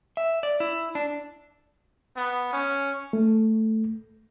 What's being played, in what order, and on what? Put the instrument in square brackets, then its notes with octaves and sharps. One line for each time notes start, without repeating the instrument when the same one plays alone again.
[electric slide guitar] E5
D5
E4
D4
[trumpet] B3
C#4
[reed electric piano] A3